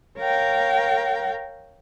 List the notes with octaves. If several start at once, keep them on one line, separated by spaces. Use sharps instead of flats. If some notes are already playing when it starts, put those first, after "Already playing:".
A#4 C#5 F5 G5